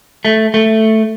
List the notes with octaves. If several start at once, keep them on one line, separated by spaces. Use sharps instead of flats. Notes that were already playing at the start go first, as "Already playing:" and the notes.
A3
A3